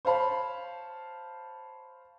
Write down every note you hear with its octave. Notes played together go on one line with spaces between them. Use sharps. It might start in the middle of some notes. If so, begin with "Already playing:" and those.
C5 C#5 F5 A5 B5